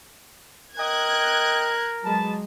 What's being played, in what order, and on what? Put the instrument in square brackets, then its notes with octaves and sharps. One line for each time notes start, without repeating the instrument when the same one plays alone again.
[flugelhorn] A#4 [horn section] D#5 G5 [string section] F#6 G#6
[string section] F#3 G#3 [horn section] B4 A5